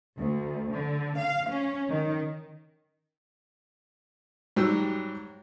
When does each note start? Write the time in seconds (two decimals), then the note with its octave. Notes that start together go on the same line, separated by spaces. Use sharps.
0.17 D2
0.74 D3
1.18 F5
1.48 C#4
1.89 D#3
4.56 G#2 F#3 G3 G4 E6